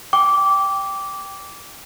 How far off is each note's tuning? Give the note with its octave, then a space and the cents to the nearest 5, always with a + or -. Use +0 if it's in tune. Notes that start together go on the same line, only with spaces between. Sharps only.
G5 +0 D6 -15